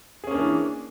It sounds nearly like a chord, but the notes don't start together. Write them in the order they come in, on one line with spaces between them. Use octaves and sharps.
G#4 C#4 A#3 D4 E3